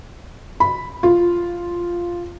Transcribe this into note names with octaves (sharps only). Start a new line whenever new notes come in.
B5
F4